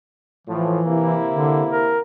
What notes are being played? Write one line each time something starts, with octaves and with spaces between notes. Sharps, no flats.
A2 E3 F3
C3 A#3 E4
D3
A#4